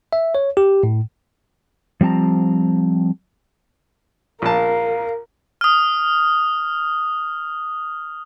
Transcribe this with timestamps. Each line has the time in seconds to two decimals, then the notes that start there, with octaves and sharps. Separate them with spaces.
0.13 E5
0.35 C#5
0.57 G4
0.83 A2
2.01 F3 G3 C4 A5 A#5
4.42 A#1 A#4 F5 A5
5.61 D#6 F6